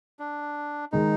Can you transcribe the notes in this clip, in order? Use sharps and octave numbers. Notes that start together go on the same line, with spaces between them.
D4
D#3 G#3 D#4